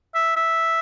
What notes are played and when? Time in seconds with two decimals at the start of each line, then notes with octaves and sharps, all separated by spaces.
0.15 E5
0.36 E5